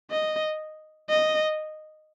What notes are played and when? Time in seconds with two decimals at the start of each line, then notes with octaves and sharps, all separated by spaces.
0.11 D#5
1.10 D#5